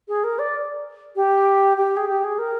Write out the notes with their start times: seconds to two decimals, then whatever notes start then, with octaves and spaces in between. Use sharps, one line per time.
0.08 G#4
0.24 A#4
0.39 D5
1.16 G4
1.77 G4
1.97 G#4
2.08 G4
2.24 G#4
2.39 A#4